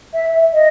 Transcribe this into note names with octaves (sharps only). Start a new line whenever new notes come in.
E5
D#5